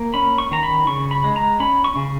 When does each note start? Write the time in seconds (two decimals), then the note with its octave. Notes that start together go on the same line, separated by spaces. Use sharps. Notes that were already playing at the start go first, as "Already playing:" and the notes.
Already playing: A#3
0.14 C#4 B5
0.38 C#6
0.51 D#3 A#5
0.63 B5
0.87 C#3 C#6
1.11 B5
1.24 G#3
1.36 A#5
1.60 C#4 B5
1.84 C#6
1.96 C#3